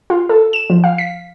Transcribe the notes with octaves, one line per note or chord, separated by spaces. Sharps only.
F4
A4
E7
F3
F5
B6